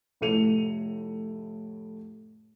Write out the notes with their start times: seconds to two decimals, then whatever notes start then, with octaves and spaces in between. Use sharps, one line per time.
0.21 F1 A2 A3 C#7 D#7 F7